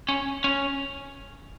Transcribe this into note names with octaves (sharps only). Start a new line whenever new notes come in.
C#4
C#4